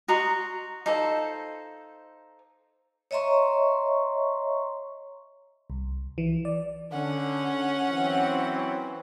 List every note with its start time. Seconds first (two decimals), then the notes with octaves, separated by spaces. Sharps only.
0.08 F#4 D#5 A#5 C6
0.86 D#4 F4 A4 C5
3.11 C#5 D#5 E5 A#5 C6 C#6
5.70 C2
6.18 E3
6.45 D5
6.92 D3 C#4 F#5
7.90 E3 F#3 C4